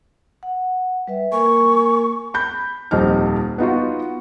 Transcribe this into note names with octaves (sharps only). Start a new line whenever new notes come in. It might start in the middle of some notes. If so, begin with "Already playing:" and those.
F#5
G3 B4 E5
A#3 A#4 G#5 C#6
B5 G6
D#1 F2 D#4 F6
B3 D#4 F4 F#4